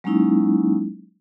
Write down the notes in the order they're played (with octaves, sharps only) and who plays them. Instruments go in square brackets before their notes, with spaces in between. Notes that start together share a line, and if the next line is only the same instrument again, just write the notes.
[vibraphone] F#3 G#3 A#3 C#4 D#4 E4